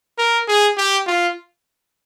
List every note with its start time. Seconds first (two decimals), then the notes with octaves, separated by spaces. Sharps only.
0.18 A#4
0.48 G#4
0.77 G4
1.07 F4